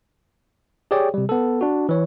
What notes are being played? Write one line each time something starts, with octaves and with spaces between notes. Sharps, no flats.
G4 G#4 C#5 D5 G5
C3 G3
B3 A4
D4 F#4
E3 C#5